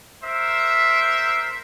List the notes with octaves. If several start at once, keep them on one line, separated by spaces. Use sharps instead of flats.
A#4 C5 E5